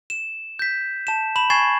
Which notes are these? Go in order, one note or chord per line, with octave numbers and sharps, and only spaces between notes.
E7
G6 B6
A5 E7
B5 E7 F#7
G#5 C#6 G#6 A6 C7 E7